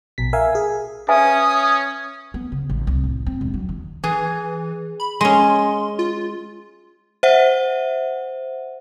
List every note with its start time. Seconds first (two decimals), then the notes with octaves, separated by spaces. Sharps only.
0.18 A#1 B2 B6
0.33 A#4 E5 F5 G#5
0.55 G#4
1.08 C#4 B4 E5 G#5 D#6
2.34 B3
2.52 C#3
2.70 A1
2.87 C2
3.04 A2
3.26 C4
3.41 E1
3.54 F#3
3.69 D#3
4.04 E3 G#4
5.00 B5
5.21 G#3 C#4 C6
5.99 F4
7.23 C5 E5 F#5